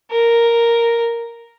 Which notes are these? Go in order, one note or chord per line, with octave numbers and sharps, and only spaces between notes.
A#4